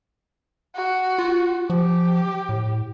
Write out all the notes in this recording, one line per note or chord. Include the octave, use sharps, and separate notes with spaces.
F#4
F4
F3 G4
A2